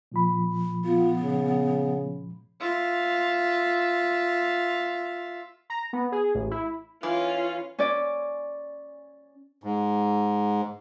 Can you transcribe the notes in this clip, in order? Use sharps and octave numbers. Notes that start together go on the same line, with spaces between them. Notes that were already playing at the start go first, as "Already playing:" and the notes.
A#2 F3 B5
B3 F4
C#3
F4 E5
A#5
B3
G#4
A1
E4
E3 C#4 F4
C#4 D5
G#2